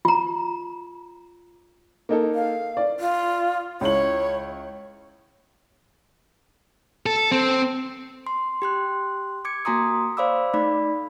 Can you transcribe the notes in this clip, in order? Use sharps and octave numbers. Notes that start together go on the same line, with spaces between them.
F4 A#5
A#3 D#4 A4
F5
D5
F4
C#2 E4 C#5 F#7
A4
C4
C6
G4 C6 F#6
D6 G#6 C#7
A#3 F#4 G#5 A#5 C6 D#6
C5 D5 F5 B5 D6 E6
A3 D#4 D5 B5